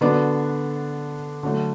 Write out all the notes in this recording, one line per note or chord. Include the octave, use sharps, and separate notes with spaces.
D3 B3 D4 F#4
D3 F#3 A3